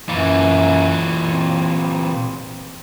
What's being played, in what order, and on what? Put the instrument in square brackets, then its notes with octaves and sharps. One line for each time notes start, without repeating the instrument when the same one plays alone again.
[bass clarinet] F#2 [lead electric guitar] A#2 E3
[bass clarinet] C4